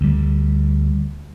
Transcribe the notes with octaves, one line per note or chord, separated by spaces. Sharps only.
D2 G3